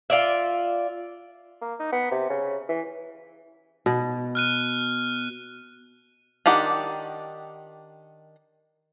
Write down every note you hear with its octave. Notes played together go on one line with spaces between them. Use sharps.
F4 D5 E5
A#3
D#4
B3
C3
C#3
E3
B2
F6 F#6 D#7
D#3 D4 G4 F#5